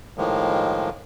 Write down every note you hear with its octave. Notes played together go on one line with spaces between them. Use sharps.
A2 D#3 F3 G#3 A#3